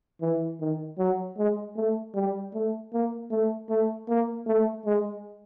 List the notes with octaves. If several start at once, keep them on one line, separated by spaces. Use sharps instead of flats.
E3
D#3
F#3
G#3
A3
G3
A3
A#3
A3
A3
A#3
A3
G#3